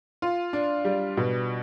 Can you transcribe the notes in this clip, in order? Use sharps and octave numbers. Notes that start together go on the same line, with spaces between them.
F4
D4
G3
B2